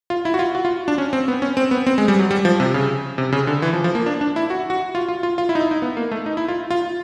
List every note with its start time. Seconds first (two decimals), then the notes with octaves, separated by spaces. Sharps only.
0.10 F4
0.25 E4
0.34 F#4
0.39 F4
0.55 F#4
0.65 F4
0.88 D4
0.98 C#4
1.13 C4
1.28 B3
1.42 C#4
1.57 C4
1.71 B3
1.87 C4
1.98 G#3
2.08 G3
2.19 F#3
2.31 G3
2.45 F3
2.60 C3
2.74 C#3
3.18 C3
3.32 C#3
3.47 D3
3.62 E3
3.73 F3
3.84 F3
3.95 A#3
4.06 D4
4.21 D4
4.36 E4
4.50 F#4
4.70 F#4
4.95 F4
5.09 F4
5.23 F4
5.38 F4
5.49 E4
5.55 D#4
5.60 E4
5.71 D#4
5.82 B3
5.97 A#3
6.11 A3
6.26 D#4
6.37 E4
6.48 F4
6.70 F4